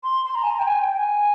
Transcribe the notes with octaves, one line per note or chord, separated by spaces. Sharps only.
C6
C6
A#5
G#5
A#5
G5
G#5
G5
G#5